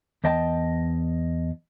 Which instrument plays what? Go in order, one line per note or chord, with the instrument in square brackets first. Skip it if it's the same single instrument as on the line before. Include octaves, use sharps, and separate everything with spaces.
[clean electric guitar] E2 C5 D#5 G5 A5